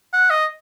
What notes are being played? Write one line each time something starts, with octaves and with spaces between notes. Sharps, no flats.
F#5
D#5